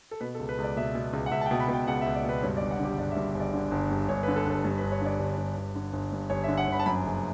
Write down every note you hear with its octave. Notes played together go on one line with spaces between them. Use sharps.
A4
B2 B4
A4
C#2
B4
C#2 D5
B2 E5
B2
C#2
F#5
C#2 E5
A5
G5
B2
B5
B2
G5
C#2 F#5
E5
C#2
D5
B2
B4
G2 C#5
D5
G1
F#5
D3 G4
G1 D5
E5
G2
G1
D5
D3
G1
G2
G1 C#5
B4
D3
A4
G1 A4
G2
B4
G1
C#5
D3 D5
G1
G2
G1
D3
G1
G2
G1 C#5
E5
D3
F#5
G1 B5
A5
F#2 B5
F#1